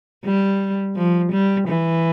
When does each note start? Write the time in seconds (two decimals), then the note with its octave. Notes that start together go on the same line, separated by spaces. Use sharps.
0.24 G3
0.96 F3
1.32 G3
1.68 E3